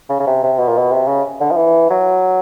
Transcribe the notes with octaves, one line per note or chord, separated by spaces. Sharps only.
C#3
C#3
C3
C3
B2
A#2
B2
C3
C#3
D3
F3
E3
F#3